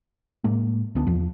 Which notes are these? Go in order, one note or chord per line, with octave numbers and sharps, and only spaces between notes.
A2 G#3 A#3
D2 B3 C#4 D4
E2 F3